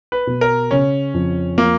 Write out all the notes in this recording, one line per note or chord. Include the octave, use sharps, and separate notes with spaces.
B4
B2
A#4
C#3 C#4
F2
F3 A#3